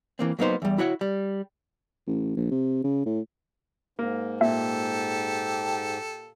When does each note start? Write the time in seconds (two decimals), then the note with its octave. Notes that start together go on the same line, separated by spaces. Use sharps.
0.19 E3 A#3 C4
0.39 F#3 A#3 B3 D#4 C5
0.62 E2 G3
0.78 E4 F#4 C#5 F#5
1.01 G3
2.07 A1
2.37 A#1
2.51 C3
2.84 C#3
3.06 A2
3.99 G#2 A#3
4.41 A#2 G4 A4 E5